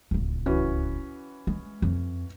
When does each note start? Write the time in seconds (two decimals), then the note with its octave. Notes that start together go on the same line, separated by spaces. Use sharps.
0.11 D1 C#2
0.46 E3 C#4 F#4
1.47 G#3
1.82 F2